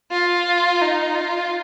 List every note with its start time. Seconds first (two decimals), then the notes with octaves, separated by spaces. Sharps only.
0.11 F4
0.81 D#4
1.15 F4